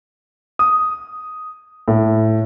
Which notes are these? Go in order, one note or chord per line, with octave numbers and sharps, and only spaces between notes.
D#6
A2